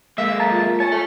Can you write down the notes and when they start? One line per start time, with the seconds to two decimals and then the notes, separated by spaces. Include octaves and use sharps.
0.18 G#3 A#3 E5 F5
0.40 A5 A#5
0.52 F4
0.80 C#5 G#5 A5
0.92 A3